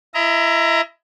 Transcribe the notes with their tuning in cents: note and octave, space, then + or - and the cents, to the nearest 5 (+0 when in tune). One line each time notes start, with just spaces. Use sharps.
E4 +25 D#5 +45 A#5 +0